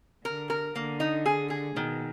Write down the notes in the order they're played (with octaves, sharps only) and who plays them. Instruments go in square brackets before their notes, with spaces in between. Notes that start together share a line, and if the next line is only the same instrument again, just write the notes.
[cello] D3 [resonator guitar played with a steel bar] A#4
[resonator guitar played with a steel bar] A#4
[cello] D3 [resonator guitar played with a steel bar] A#3
[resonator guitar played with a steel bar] D#4
G#4
G#4
[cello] B2 [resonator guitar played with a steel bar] D#3